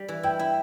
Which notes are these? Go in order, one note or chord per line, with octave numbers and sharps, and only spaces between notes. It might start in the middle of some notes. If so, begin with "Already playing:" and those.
Already playing: G3
E3
E4 G5
E4